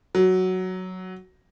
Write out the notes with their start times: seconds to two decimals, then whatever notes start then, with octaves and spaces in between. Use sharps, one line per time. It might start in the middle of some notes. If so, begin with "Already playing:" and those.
0.15 F#3